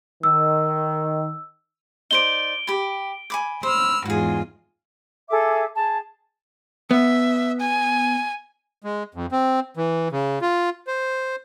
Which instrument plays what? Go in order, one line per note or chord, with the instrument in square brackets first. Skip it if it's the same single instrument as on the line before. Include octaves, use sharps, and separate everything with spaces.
[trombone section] D#3 [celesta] E6
[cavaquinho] D#4 C5 D5 [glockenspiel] D7 G7
[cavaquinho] G4 B5
G#5 B5 D6
[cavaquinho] C5 [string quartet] B5 E6 F6
[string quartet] E2 G#2 F4 [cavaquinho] F#4 G#4
[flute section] G#4 A4 E5 D6
G#4 A5
[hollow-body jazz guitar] B3 [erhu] E5
[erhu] G#5
[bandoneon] G#3
F2
C4
E3
C#3
F4
C5